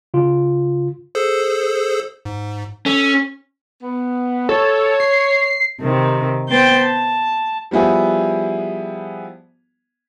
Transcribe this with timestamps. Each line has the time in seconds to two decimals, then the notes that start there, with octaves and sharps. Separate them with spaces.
0.14 C#3 F4
1.15 G#4 A4 C5
2.25 G#2
2.86 C#4 A4
3.83 B3
4.49 A4 C#5
5.00 C7
5.80 C3 D#3
6.49 B3 C5 G5 G6 A6
6.82 A5
7.71 F3 G3 B3 E4 G#4